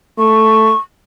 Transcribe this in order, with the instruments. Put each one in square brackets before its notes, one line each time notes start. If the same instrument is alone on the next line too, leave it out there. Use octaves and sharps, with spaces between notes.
[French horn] A3 [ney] C#6